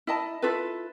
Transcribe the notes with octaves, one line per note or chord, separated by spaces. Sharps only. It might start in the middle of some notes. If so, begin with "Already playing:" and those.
E4 D#5 A5
E4 F4 A4 B4